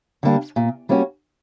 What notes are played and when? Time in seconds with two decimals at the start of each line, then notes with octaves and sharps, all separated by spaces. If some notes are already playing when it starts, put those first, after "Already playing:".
0.23 D3 G3 A#3 D4
0.56 A#2
0.89 G3 A#3 C#4 F#4